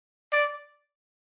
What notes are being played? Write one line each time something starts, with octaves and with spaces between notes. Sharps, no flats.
D5